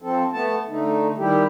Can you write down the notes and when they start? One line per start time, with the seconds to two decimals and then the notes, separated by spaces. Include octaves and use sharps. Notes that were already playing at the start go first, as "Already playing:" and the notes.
0.02 F3 C4 A4
0.33 A3 B3 A5
0.69 D3 A3 D#4
1.18 D#3 G3 E4 G4